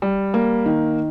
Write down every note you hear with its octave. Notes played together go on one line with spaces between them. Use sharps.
G3
A#3
D#3